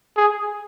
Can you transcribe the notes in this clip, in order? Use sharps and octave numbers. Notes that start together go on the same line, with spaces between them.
G#4